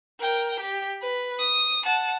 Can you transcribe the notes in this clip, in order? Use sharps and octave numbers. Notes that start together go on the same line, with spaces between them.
A#4 G5
G4
B4
D#6
F#5 A5